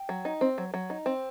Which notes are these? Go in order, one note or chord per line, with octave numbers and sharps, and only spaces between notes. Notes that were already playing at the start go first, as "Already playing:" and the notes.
Already playing: G5
F#3
D#4
C4
F#3
F#3
D#4
C4